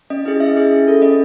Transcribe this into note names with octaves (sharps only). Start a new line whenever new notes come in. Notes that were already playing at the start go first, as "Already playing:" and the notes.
C#4 D#5
E4 G#4 D#5
C#4 E5
E4 G#4
C#4
F4 A4
C#4 D#5